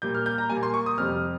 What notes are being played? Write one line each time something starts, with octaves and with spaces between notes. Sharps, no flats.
A#2 G3 A#3 G6
F6
G6
A#5
A#2 G3 A#3 G#5
C6
C#6
D#6
F2 C3 G3 F6